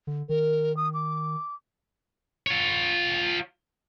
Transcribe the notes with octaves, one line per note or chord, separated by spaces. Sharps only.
D3
D#3 A#4
D#6
D6
F4 C#5